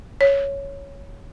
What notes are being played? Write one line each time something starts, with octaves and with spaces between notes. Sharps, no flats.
C#5